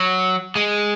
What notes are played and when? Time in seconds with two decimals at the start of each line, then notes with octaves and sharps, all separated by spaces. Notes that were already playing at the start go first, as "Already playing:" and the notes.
Already playing: F#3
0.55 G#3